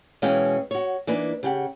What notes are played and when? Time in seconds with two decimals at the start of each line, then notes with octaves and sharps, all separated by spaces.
0.22 B2 E3 G#3 C#4 F5 G5
0.71 F#4 C#5
1.07 E3 A#3 D4 D#4 B4
1.43 C#3 G4 F#5